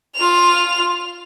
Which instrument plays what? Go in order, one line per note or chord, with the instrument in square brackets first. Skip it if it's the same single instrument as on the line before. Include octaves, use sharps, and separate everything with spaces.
[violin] F4 F7